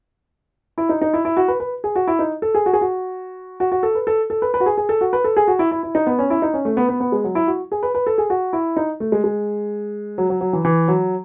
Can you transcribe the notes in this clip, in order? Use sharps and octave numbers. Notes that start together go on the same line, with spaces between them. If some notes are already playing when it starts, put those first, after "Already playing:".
E4
D#4
D#4
E4
E4
F#4
B4
B4
G#4
F#4
E4
D#4
A4
G#4
F#4
G#4
F#4
F#4
F#4
A4
B4
A4
A4
B4
B4
F#4
G#4
G#4
A4
F#4
B4
A4
G#4
F#4
E4
E4
E4
D#4
B3
C#4
E4
D#4
C#4
A3
B3
B3
B3
G#3
F#3
E4
F#4
G#4
B4
B4
A4
G#4
F#4
E4
D#4
A3
G#3
G#3
F#3
F#3
F#3
E3
E3
F#3